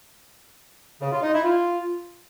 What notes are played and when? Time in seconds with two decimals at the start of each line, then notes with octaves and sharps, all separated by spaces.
1.01 C#3
1.11 F4
1.22 D#4
1.33 E4
1.43 F4